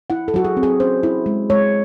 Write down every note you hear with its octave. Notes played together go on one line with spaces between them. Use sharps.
E4 F#5
A4
F#3 F#4
G#4
C4
G#4
C#4 C5
E4
G#3
G#3 C#5